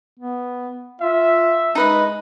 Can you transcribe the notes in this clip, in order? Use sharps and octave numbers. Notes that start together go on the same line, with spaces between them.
B3
F4 E5
G#3 D#4 B4 D#5